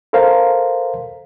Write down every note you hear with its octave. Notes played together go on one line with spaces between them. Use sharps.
A4 A#4 C5 F5 A#5 C6